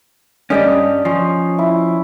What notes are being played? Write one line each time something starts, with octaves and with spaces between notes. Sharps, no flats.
G2 G3 C#4 D5 D#5 G#5
F3 C#4
E4